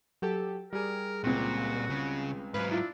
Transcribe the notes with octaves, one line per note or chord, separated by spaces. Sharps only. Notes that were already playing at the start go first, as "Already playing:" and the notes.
F#3 G4 A4
G3 G#4 A#4
C#2 A#2 C4 F#4
C#3
G#2 F#3 B4 F5
D4 E4 F4